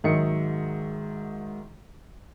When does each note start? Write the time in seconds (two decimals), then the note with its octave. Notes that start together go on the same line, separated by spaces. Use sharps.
0.04 G#2 D#3 F#3 D#5 E5 C#7